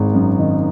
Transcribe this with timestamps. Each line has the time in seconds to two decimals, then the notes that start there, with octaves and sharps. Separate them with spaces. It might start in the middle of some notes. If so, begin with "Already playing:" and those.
Already playing: G#1 G#3
0.15 F#2
0.38 D#3